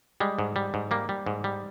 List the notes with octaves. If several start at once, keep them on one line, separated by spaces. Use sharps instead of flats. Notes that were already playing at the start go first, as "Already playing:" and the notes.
G3 G#3
G#2
G3
G#2
G3 A#3
G3
G#2
G3